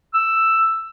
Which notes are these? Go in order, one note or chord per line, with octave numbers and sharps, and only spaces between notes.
E6